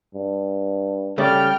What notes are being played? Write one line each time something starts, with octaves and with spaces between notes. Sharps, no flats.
G2
C#3 G3 A3 D5 G5 F6